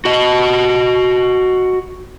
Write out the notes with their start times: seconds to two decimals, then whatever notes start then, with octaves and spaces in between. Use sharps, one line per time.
0.05 F#4 D#5